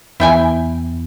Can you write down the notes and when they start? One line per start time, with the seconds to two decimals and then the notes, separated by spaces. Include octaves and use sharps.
0.20 E2 E4 G5 G#5